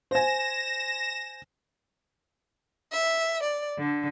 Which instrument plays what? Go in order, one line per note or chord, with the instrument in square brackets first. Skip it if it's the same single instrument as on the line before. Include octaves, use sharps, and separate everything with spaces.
[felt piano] C5 G#5 [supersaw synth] A#6 E7
[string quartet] E5
D5
D3